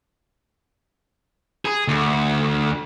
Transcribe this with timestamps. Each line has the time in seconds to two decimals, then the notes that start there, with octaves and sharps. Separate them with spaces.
1.65 G#4
1.88 D2